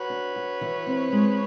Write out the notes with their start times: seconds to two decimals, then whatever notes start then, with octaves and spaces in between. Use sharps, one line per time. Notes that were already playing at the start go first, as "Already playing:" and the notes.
Already playing: F#4 B4 C#5
0.10 D4
0.36 F#4
0.61 E3
0.87 C4
1.12 G#3